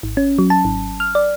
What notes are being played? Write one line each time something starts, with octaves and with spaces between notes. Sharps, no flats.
G#1
C#4
F#3
A5
G#1
F6
D5